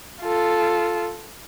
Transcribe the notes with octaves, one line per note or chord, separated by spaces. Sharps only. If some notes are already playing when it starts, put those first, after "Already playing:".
F4 A4